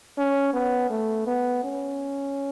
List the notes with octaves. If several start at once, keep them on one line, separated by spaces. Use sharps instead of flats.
C#4
B3
A3
B3
C#4